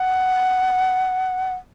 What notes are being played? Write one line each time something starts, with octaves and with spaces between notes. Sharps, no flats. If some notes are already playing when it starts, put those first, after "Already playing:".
Already playing: F#5